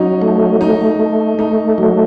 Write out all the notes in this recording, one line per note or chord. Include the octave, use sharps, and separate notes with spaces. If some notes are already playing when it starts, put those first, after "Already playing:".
Already playing: F#3 C#4 D#4
A3
A3 D#4
A3
A3 D#4
F#3